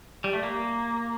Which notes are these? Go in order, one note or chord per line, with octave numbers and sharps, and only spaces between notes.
G3
A3
A#3